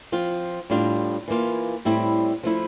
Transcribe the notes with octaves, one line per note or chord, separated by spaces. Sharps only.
F3 C4 F4
A2 G3 D4 F4
E3 A#3 F4
A2 G3 C4 E4
F3 A3 E4